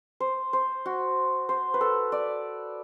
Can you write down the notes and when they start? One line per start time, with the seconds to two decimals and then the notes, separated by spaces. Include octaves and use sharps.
0.20 C5
0.53 C5
0.86 F#4
1.49 C5
1.74 B4
1.81 A4
2.12 D5